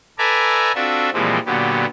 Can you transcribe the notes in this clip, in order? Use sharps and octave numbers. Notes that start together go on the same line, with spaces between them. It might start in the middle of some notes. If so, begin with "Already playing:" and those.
A4 B4 D5 E5 G#5 A#5
C4 D4 F4 F#4 A4 E5
A#2 E3 F3 G3 G#3 C4
A#2 D3 F#3 B3 G4